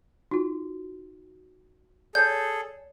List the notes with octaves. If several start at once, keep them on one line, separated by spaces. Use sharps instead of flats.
D#4 F4 F#4
G#4 A4 C#5 D5 G6